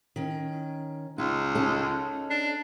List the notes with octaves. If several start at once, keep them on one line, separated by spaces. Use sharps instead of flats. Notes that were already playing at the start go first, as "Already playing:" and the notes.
D#3 C#4
C#2 D#4
C#4 D#4 A4
D4